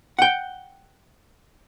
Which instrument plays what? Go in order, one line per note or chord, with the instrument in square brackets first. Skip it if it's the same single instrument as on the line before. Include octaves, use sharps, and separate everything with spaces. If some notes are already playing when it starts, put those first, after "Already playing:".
[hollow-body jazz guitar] F#5 G5